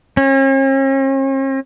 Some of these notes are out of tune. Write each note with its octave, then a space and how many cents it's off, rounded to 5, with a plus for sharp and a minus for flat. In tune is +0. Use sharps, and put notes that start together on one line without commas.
C#4 -45